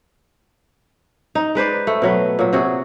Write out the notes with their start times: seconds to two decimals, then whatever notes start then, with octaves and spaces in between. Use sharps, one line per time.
1.35 D#4
1.55 G#3 B4 C5 D5
1.87 A3
2.02 B2 F#3 B4
2.39 A#2 F#3
2.53 C3 F#4 G#4